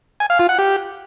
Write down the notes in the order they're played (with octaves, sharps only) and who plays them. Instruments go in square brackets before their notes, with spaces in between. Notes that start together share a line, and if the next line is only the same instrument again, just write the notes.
[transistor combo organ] G#5
F5
F4
F#5
G4